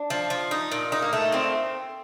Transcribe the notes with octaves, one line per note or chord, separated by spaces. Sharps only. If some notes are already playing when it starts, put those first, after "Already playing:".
Already playing: D4
F3
F3
D#4
A#2
D#4
A#3
A3
A#2 C4